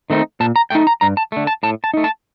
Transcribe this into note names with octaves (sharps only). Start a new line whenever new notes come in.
D#3 A3 C4 D#4
A#2 A5
A#5
A3 D#4 G5
A#5
G2 A#5
A5
D3 A3
A5
A2 A5
A5
A3 D#4
A5